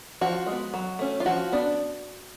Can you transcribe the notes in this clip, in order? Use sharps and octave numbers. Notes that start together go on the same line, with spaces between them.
F3 F#4
G#3
B3
F#3
A3 C#4
F4
F3 F#4
B3 D4